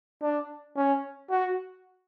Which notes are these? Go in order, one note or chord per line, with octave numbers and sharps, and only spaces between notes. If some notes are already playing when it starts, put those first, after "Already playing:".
D4
C#4
F#4